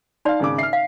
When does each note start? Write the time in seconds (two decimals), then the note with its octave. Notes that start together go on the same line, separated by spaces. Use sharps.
0.25 D#4 D5 F5 C6
0.40 G#1 C#3 D#4 D6
0.58 E5 F6 C7
0.73 F5